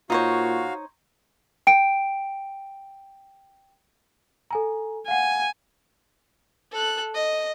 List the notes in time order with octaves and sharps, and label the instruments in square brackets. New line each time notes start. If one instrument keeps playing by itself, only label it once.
[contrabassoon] A#2 [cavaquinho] D#4 C5 C#5 [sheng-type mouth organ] F#4 F5
[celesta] G5 D7
A4 G#5 A#5
[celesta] F5 F#5 [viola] G#5
[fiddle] A4 F#6
D#5